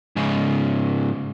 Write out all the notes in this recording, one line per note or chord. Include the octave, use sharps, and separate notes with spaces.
G#2 C#3